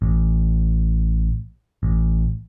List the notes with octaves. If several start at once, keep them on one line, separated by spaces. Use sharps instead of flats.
A1
A1